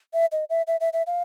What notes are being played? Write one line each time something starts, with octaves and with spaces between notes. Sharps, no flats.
E5
D#5
E5
E5
E5
E5
F5